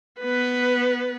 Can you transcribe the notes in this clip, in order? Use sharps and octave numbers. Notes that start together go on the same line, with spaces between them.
B3 B4